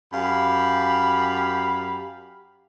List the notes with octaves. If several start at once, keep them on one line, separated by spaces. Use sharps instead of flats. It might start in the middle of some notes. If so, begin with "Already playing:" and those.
F#2 G4 F5 B5